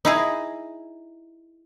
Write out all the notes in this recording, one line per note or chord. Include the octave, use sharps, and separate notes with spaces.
D#4 E4 G#4